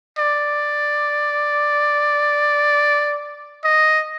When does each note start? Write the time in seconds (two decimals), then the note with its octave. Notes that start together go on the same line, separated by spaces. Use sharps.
0.18 D5
3.64 D#5